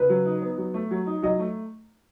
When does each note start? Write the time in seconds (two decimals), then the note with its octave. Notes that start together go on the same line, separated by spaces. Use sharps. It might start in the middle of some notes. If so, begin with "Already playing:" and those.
Already playing: C#3 B4
0.09 F#3
0.26 D#4
0.42 B3
0.58 F#3
0.74 A3
0.91 F#3
1.06 D#4
1.23 F#3 D#5
1.39 A3